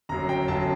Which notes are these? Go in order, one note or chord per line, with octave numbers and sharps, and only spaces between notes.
G1 F#2 F#3 A#5
G5
G1 F#2 F#3 A5